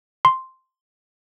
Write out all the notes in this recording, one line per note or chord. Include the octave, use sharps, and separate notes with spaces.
C6